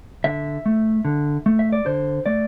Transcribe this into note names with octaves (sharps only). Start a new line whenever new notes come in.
D3 E5
A3
D3
A3
E5
D5
D3 C5
A3 D5